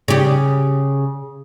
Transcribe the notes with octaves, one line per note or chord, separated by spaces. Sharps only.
C#3 G4